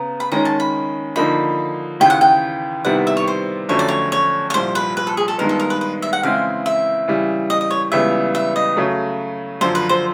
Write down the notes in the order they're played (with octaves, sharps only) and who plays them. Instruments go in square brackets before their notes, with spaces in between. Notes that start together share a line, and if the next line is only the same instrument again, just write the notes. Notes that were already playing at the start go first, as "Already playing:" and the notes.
Already playing: [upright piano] C#3 B3 [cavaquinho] A#5
[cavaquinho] B5
[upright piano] D#3 G#3 C#4 [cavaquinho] A#5
[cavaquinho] A5
B5
[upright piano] D3 F3 A#3 D#4 [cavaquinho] B5
[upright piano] D#2 C#3 E3 [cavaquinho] G5
[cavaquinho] F#5
G5
[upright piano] C3 D#3 G3 B3 E4 [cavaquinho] F#5
[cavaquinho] E5
C#5
C5
[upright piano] F2 D3 F#3 A3 C#4 [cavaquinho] C#5
[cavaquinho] D5
C#5
C#5
C#5
[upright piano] C2 A#2 F3 [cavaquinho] C5
[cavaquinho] B4
B4
A4
G#4
A4
[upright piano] G2 D#3 G#3 B3 [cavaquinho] A#4
[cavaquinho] A4
A#4
B4
B4
E5
F#5
[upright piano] C#3 E3 G#3 C4 E4 [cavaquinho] F5
[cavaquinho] E5
[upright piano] C#3 E3 G3
[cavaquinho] D#5
D#5
C#5
[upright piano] C#2 C#3 E3 G3 B3 [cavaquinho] E5
[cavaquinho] E5
D#5
[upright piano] C#3 F#3 A3
[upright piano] F#2 D3 F3 [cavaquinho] C5
[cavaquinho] B4
C5